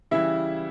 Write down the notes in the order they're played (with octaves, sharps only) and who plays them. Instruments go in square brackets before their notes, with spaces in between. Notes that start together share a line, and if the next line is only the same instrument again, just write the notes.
[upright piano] C#3 E3 G3 E4 E5